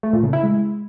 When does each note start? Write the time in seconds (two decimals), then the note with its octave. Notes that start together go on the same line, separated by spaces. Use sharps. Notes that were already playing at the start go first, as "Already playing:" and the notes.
0.03 A3
0.13 A#2
0.23 C#3
0.33 E4
0.43 G#3